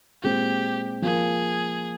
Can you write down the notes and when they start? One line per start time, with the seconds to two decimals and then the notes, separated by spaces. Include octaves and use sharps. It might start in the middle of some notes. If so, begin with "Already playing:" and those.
0.23 A#2 G#3 C4 G4
1.02 F3 A#3 F4 G#4 A#4